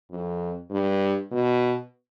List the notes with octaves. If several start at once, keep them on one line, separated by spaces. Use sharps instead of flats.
F2
G2
B2